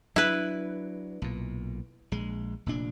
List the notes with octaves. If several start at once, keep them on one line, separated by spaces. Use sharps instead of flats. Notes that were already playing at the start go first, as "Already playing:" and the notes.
F#3 C4 D4 E4 B4
B1 A#2
A#1 G#3
F1 A#2 D4